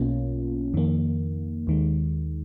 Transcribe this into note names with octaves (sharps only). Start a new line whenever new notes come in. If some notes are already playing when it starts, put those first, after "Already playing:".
Already playing: B1 B2 A#3 C#4 F4
F2 D#3 A#3
D#2 D#3 G#3